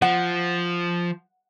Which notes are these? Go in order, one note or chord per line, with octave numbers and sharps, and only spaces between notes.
F3 F#5